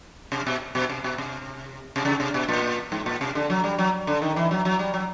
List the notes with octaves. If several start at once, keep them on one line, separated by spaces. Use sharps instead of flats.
C3
B2
B2
C3
B2
C3
C3
C#3
C3
B2
A#2
G#2
A#2
C3
D3
F#3
G3
F#3
D3
D#3
E3
F#3
F#3
G3
F#3